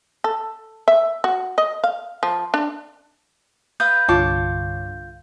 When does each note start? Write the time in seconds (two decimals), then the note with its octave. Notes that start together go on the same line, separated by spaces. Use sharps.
0.24 A4
0.88 E5
1.24 F#4
1.58 D#5
1.84 F5
2.23 F3
2.54 D4
3.80 B4 F5 D#6 G6
4.08 C2 G2 D3 F4 C#5 A5 D6